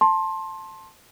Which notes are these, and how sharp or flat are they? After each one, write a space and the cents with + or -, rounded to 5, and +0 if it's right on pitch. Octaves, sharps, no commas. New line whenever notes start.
A5 +0 C6 +20